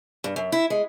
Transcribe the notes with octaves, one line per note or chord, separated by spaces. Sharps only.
G2
F#2
E4
G#3